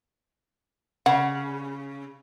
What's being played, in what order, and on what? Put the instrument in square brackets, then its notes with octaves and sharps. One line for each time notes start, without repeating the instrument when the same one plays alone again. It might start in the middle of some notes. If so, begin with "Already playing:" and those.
[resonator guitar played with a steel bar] C#3 [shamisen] F#5